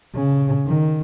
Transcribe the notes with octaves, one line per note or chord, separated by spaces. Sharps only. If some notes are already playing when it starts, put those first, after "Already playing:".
C#3
D#3